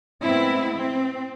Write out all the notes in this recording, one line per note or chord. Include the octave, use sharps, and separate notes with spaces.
A2 G#3 B3 C4 E4
C4